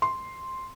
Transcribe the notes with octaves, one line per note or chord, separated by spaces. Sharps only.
C6